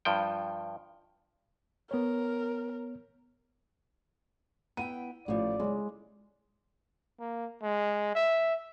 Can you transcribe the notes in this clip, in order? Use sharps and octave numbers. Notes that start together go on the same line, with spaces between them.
G2 F3 G5
B3 A#4 C#5
B3 E4 G5 D#7
A1 A2 F3 D5
C#3 G#3
A#3
G#3
E5